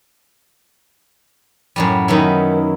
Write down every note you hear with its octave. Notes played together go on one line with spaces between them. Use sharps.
F#2 A2 G3
D#3 F#3 B3 C#4 E4